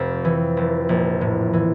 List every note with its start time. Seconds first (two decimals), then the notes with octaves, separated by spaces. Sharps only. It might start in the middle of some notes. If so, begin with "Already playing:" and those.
Already playing: F1 F2
0.25 E3
0.57 F1
0.89 A#1
1.21 A2
1.53 E3